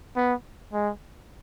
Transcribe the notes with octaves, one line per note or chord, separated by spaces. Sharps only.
B3
G#3